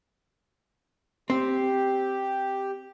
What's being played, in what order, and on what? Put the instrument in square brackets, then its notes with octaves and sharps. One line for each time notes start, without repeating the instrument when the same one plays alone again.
[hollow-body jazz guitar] C4 [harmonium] G4